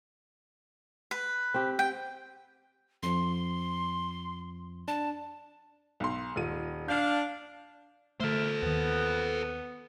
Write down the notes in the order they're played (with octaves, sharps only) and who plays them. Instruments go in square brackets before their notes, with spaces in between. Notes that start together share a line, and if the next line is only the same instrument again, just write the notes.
[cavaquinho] B4
[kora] C4 G4
[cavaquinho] G5
[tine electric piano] F2 F3 [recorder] C6
[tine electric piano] D4 [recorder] A5
[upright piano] B1 C6
D#1 F4 D#7
[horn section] D4 F5 [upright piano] G6
[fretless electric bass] D3 A3 [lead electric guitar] A4 C5 [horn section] A#4 E5
[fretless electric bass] D#2 D#3 [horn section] B3